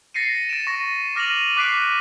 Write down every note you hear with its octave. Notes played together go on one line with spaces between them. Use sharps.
A6 A#6 C7 C#7 D#7
A6 D7 E7
C#6 A#6 D#7
D6 F6 A#6 D#7 F7 F#7
D6 F#6 B6 C7 D7 D#7